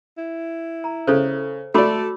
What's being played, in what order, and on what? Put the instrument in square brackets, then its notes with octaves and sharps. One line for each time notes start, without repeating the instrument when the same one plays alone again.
[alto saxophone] E4
[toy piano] A#5
[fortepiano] C#3 [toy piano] A4 C5
[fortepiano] A3 D5 [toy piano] F#4 B5 D6 [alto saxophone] A4